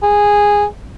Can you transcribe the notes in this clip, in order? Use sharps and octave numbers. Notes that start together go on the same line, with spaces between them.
G#4